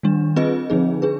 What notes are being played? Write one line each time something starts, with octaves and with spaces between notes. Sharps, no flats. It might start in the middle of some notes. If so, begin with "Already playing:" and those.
D#3 G3 D4
C4 F4 G#4 B4 D#5
D3 F3 C4 D#4 G#4
D4 G#4 B4